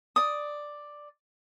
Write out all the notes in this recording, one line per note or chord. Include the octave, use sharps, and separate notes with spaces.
D5 D#6